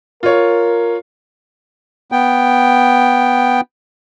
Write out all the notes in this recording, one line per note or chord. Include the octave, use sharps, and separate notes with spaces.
F4 A#4 C#5
B3 G5